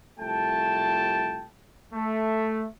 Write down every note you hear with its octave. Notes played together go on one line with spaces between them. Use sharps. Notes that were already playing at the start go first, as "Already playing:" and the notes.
C2 F3 A3 G5 A5
A3